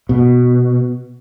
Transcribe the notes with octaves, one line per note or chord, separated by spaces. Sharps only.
B2